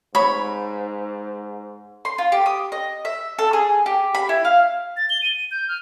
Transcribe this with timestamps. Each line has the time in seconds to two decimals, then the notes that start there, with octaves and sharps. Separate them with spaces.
0.15 G#2 C#5 B5
2.05 C6
2.18 F4
2.32 G4
2.46 D#6
2.72 D#5
3.05 E5
3.39 A4
3.53 G#4
3.86 G4
4.15 B5
4.29 E4
4.45 F5
4.97 A6
5.10 G7
5.22 D#7
5.35 D#7
5.51 G6
5.68 F6